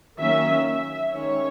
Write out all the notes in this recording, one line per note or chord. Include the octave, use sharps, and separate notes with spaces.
D#3 F#3 A#3 C#4 E5
E5
D#3 G#3 C#4 C#5